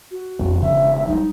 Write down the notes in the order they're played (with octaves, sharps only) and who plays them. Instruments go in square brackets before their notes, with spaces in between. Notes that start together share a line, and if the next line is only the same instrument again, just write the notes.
[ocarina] F#4
[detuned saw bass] E1 [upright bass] F2 B3
[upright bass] C#3 [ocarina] E5
[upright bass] F#3 G3 [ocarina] D#4